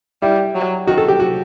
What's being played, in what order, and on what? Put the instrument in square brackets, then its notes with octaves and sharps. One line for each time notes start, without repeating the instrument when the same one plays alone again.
[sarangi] G3 [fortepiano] E4
[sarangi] F#3
[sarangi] D#3 [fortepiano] F#4
[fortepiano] A4
G4
F#4